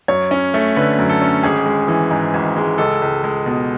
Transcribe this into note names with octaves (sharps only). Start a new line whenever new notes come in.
F#2 C#5
C#4
A3
D3 B4
F#2
A4
C#4
G#1 G#4
G#3
E3
G#2
G#1
G#3
C#2 A4
C#2
G#3
B2